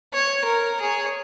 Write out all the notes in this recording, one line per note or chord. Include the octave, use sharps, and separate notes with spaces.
C#5
A#4
G#4 C#5